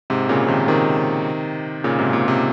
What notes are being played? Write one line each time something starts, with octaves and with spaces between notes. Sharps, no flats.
G#2 C3
A#2 C#3
C3 D#3
C3 D#3
A#2 C#3
G#2 C3
A#2
C3